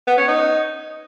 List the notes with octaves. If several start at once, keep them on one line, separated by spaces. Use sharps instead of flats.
B3
C#4
D#4